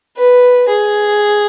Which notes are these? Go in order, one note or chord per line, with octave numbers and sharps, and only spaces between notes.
B4
G#4